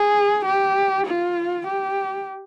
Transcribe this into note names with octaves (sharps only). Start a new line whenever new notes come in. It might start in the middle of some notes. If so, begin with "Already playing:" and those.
Already playing: G#4
G4
F4
G4